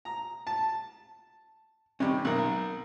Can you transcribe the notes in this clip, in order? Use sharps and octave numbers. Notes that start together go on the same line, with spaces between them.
A#5
A5
C3 D#3 G3 C#4
B1 A#4 F#5